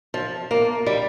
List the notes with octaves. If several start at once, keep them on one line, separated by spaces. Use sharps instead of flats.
F3
A#3
G3